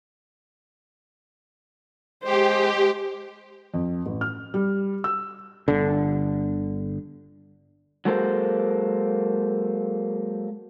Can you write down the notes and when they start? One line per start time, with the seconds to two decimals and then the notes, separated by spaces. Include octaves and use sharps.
2.24 G#3 G4 C5
3.74 F2
4.06 A1
4.21 F6
4.54 G3
5.04 E6
5.68 G1 D3
8.05 F#3 G#3 A#3 A4 C5